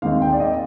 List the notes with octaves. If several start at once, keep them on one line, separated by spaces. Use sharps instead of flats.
D#2 D#3 G#3 C4 D#4 F5
G5
D5
D#5